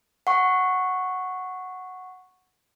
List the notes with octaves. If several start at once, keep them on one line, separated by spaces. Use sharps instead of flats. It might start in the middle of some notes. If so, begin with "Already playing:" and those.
F#5 C#6